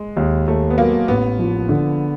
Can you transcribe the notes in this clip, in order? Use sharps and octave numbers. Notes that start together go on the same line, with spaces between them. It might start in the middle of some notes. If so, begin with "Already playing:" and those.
Already playing: G#3
D#2 G#3
D#2 A3
B3
F#3 A#3
A1 B3
F3
D3